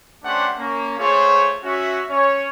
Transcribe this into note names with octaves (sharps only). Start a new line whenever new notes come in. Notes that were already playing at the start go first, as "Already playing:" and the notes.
A3 C#4 D4 G4 C5 F#5
A#3 C#4
A3 F4 G#4 C5 C#5
C#4 F#4 E5
C#4 C#5